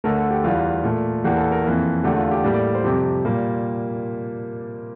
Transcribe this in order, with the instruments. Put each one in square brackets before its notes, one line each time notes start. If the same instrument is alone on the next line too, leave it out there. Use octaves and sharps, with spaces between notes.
[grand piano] D2 D3 A3 A#4
A4
G4
E2 E3 G3 F4
A#2 A3
E2 E3 A#3 G4
A4
A#4
F2 E3 A#3
E2 D3 A3 G4
F4
G4
A2 G3 A#3 D5
D5
C5
F2 C3 G3 G4
A#2 G3 A#3